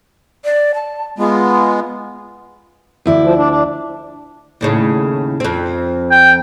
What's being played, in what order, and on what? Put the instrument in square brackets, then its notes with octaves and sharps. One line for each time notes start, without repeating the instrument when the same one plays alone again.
[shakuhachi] D5
A5
[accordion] G#3 B3 [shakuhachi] F4
[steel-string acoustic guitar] D2 E4 D5
[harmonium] F3
D4
D4
[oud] D#2 A2 C#3
F2 C4
[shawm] G5